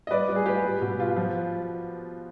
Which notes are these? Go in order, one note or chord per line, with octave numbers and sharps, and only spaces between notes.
D#5
G3 B4 D5
G3
G#4
G3 G4 B4
G3
B2
F4
F3